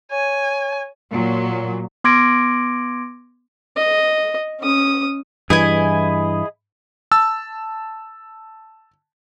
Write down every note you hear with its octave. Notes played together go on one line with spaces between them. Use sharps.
C#5 G#5
A#2 F#3
B3 C6 D6 G#6 A#6 D7
D#5
C#4 D#6
G2 E3 E4 G#4 D#5 G#5
A5 E6